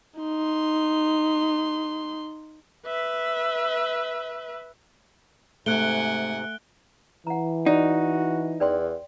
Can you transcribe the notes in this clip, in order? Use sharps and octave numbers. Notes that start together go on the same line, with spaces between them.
D#4 C6
B4 E5
G#2 C3 A3 F#5 G#5 F#6 D7 G7
E3 F#5 A#5
D#4 F#4 D5
E2 D5 G5 C6